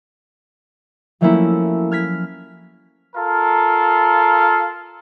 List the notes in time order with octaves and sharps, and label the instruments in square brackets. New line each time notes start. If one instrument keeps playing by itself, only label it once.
[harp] F3 F#3 A3 A#3 C#4 E4
F6 G#6 B6
[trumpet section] F4 A4 A#4 F5